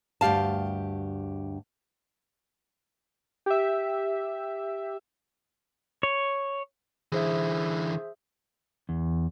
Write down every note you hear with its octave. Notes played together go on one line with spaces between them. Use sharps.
D2 G2 G4 F5 A5
G4 E5
C#5
D3 E3 G#4 C5 E5
E2